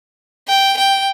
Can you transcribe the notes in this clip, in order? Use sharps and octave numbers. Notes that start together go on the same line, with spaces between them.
G5
G5